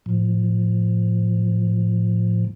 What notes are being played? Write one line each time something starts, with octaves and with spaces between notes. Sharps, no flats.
A2 F3